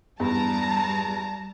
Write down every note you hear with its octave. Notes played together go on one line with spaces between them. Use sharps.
E2 G2 G3 A5 A#5